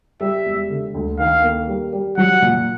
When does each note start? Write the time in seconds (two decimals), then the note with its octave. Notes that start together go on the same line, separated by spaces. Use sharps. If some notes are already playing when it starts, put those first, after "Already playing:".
0.20 G3 E5
0.46 E1
0.70 D3
0.94 D2
1.19 D#3 F5
1.44 A#3
1.68 G3
1.93 G3
2.17 F#3 F#5
2.42 A#2